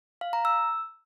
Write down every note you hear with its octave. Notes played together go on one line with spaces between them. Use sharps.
F5
A#5
E6